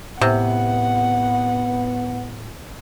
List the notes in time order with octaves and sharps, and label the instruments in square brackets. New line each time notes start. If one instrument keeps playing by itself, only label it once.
[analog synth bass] A2 [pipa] C3 [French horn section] B3 [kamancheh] F#5